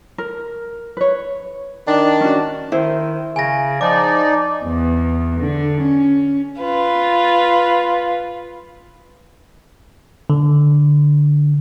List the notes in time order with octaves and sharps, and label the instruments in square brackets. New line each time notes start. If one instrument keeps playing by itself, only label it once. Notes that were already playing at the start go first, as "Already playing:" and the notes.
[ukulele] A#4
B4 C#5
[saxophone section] D#3 D4
[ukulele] C#4 F#4
[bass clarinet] D#3 [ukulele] E4 C5
[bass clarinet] C#3 [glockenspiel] G#5 A#6
[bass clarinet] F3 [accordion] D#4 D5 [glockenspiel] D6
[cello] E2
D3
C#4
[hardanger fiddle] F4 B4
[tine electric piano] D3